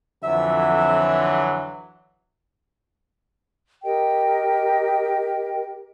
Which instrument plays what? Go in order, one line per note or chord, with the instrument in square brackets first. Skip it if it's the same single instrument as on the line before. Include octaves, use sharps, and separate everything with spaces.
[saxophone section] F2 E5 [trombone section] D3 E3 F#3
[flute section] G4 A#4 D#5 G5